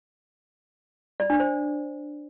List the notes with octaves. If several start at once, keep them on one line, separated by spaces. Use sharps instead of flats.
D5
D4
C5